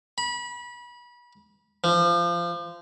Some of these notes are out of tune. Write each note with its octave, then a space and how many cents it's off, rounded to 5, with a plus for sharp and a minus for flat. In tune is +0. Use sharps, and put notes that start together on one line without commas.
B5 -30
F3 -20